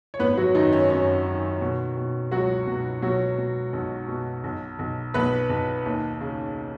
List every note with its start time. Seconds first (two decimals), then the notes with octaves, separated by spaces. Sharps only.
0.14 C#5
0.19 G#1 B3 B4
0.37 F#3 F#4
0.55 F#2 D#3 D#4
0.72 C#4
0.90 F#2 C#4
1.26 D#3
1.61 B2
1.97 B2
2.31 C#2 F#3 F#4
2.67 B2
3.02 B2 F#3 F#4
3.38 B2
3.73 B1
4.08 B2
4.44 B1
4.79 B1
5.14 B1 B3 B4
5.50 B1
5.86 D#2
6.21 C#3